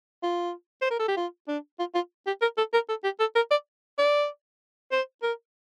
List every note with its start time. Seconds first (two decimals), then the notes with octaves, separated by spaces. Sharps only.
0.23 F4
0.82 C5
0.90 A#4
0.99 A4
1.08 G4
1.17 F4
1.48 D4
1.79 F4
1.95 F4
2.27 G4
2.42 A#4
2.58 A4
2.73 A#4
2.89 A4
3.04 G4
3.20 A4
3.36 A#4
3.51 D5
3.98 D5
4.92 C5
5.23 A#4